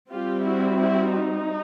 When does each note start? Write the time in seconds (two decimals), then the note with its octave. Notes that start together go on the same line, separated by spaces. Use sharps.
0.11 G3 C4 F4 G4
0.45 E4 F#4
0.79 E4 F#4
1.13 D#4